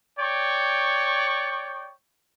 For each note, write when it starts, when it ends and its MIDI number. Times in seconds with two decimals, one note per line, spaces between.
0.19 1.90 73
0.19 1.90 74
0.19 1.90 79
0.19 1.90 85